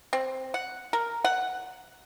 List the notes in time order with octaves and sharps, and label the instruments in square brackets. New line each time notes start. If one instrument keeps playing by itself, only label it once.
[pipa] C4
F#5
A#4
F#5